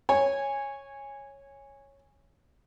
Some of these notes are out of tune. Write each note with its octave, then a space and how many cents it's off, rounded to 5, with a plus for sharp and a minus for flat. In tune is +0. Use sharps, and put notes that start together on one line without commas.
C#5 -5 G#5 -10